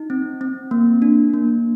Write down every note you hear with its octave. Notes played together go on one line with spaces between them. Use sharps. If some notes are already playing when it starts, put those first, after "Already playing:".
Already playing: D#4
C4
C4
A#3
D4
A#3